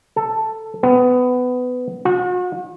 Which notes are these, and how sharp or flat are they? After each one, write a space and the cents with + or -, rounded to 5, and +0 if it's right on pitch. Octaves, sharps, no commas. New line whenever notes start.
A4 +5
B3 +20
F#4 -40